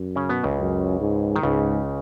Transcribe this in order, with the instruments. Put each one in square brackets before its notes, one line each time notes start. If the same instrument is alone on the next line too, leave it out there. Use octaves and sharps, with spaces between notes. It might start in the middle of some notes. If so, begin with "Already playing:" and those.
Already playing: [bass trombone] F#2
[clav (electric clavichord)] C#3 C#4
B2 B3
C#2 C#3
[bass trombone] F#2
G#2
[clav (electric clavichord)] D#3
[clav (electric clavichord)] C#2 C#3 [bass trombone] G#2